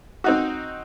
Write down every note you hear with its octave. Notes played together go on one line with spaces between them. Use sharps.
C4 D#4 F#4